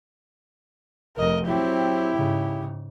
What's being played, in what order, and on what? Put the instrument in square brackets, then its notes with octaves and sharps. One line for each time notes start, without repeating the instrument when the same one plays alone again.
[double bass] F1 F2 [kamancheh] A#4 D#5
[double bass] F#3 C4 [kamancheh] E4 G4
[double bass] G#2 C#3